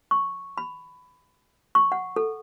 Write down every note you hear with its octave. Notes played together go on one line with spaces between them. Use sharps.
C#6
B5
C#6
F#5
A4